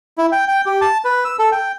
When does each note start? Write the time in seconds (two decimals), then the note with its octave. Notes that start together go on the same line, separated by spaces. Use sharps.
0.18 E4
0.32 G5
0.48 G5
0.66 G4
0.81 A5
1.05 B4
1.25 E6
1.39 A4
1.52 G5